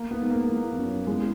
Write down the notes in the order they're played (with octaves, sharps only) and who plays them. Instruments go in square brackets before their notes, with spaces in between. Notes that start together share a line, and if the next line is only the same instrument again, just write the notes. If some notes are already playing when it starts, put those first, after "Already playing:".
Already playing: [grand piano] A#3
B3
[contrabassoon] G#2
[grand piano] A#3
[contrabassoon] E2
E2
F#2
[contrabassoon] E2 [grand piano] G#3